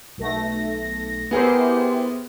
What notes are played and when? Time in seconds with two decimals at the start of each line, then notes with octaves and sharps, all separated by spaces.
0.18 B1 A3 A#6
1.31 B3 E4 G4 G#4 A#4 C5